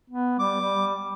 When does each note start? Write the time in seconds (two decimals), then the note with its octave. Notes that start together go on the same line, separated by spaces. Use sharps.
0.10 B3
0.39 G3 D6
0.62 G3